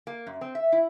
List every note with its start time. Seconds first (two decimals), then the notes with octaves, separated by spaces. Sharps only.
0.07 A#3
0.27 F#2
0.41 C4
0.55 E5
0.72 E4